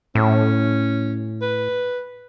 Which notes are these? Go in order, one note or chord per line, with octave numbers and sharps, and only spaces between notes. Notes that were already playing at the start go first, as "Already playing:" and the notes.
A2 C#4
B4